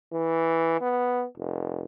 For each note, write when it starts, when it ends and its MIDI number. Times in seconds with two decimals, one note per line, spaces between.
0.12 0.78 52
0.81 1.25 59
1.37 1.84 29